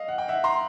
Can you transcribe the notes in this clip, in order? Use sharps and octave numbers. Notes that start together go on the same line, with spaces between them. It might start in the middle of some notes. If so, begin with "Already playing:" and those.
Already playing: D#5 F5
F#5
G5
E5 F#5
A#5 C6